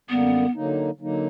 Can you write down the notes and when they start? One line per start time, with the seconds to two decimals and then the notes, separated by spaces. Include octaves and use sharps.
0.10 F#2 D3 G3 A#3 B3
0.54 D3 F#3 A#3 D#4
0.99 D3 F#3 A#3 D#4